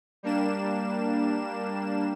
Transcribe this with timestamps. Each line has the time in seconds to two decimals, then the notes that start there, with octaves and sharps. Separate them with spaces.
0.23 G3 A#3 D4 E7